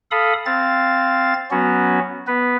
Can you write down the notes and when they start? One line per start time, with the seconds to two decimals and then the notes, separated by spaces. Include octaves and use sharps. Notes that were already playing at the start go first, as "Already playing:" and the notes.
0.11 A4 F5 B5 D#6
0.46 C4 F5 A6
1.51 F#3 B3 C#4 F#4
2.27 B3 B4